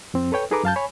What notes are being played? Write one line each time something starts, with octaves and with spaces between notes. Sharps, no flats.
F2 C4
A4 B4 C#5 G5
D#4 G#4 A4 B4 A#5 D6
F#2 F5 A5 G6
C#5 G#5 B5